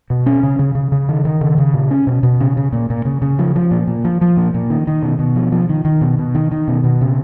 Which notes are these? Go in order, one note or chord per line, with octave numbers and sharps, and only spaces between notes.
B2
C#4
C#3
C#3
C#3
C#3
D#3
D#3
C#3
C#3
A#2
C#4
B2
B2
C#3
C#3
A#2
A#2
C#3
C#3
F3
F3
A#2
A#2
F3
F3
A#2
A#2
D#3
D#3
B2
B2
F3
F3
D#3
D#3
B2
B2
D#3
D#3
B2
B2
C#3